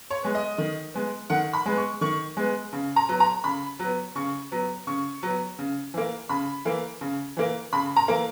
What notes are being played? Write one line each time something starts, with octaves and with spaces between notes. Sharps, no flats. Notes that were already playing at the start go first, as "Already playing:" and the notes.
C#5
G#3 B3
D#5
D#3
G#3 B3
D#3 F#5
B5
G#3 B3
C#6
D#3 C#6
G#3 B3
C#3
A#5
F#3 B3
A#5
C#3 B5
F#3 B3
C#3 C#6
F#3 B3
C#3 C#6
F#3 B3
C#3
E3 A#3
C#3 B5
E3 A#3
C#3
E3 A#3
C#3 B5
A#5
E3 A#3